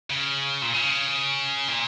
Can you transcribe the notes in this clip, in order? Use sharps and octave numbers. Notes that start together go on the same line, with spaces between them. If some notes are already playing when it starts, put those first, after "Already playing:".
C#3
A#2
C#3
A#2